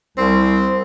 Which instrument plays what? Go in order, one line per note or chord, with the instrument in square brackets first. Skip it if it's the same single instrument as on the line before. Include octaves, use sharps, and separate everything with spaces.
[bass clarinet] C2 [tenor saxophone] C4